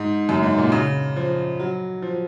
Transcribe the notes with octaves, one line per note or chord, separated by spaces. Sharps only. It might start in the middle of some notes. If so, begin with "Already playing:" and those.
Already playing: G#2
F#2
G#2
A#2
C#3
F3
F#3
F3